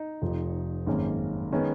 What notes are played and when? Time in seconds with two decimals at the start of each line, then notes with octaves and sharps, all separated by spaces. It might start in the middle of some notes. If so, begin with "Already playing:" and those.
Already playing: D#4
0.22 F1 F2 F3
0.87 G#1 F#2 D#3 A#3 C#4
1.52 D#3 G#3 B3 C#4